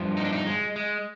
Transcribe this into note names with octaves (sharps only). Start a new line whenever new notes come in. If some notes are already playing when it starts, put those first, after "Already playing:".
Already playing: G2 F3
D#4
D4
D#4
G#3
G#3